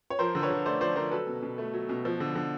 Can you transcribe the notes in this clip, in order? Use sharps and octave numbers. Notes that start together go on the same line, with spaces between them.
C#5
F3 A#4 C5
D3
B4 C#5
D3
A3 C5 D5
F3 C5 D5
D3 A#4 C5
F#3 A4 B4
B2
B2
A3
F#3
B2
F3
D3
D3